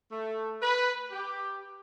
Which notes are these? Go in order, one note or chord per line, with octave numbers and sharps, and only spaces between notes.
A3
B4
G4